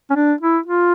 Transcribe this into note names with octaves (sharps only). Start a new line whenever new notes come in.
C#4
D4
E4
F4